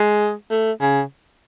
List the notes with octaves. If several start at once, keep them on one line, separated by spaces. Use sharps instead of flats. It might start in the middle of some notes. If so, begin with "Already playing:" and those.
Already playing: G#3
A3
C#3